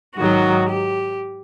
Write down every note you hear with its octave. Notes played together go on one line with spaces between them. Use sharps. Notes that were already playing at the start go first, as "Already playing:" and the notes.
G#2 D#3 F#3 F#4
G4